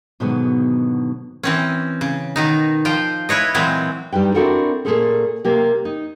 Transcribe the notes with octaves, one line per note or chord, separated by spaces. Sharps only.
G#2 B2 D3 D#3 F#3 B3
E3 C4 C#4
C#3
B2 D#3 D#4
F3 F4 G5
E4 B4 C#5 D#5
A#2 E3 F#3 G#3 C4
G2 G3 D#4 B4 G5
C4 D4 E4 F#4 A4 A#4
A#2 F#3 A3 G#4 A4 C5
C3 A#3 G4
D#4